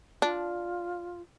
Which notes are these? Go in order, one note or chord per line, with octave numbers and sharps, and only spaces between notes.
D4 F4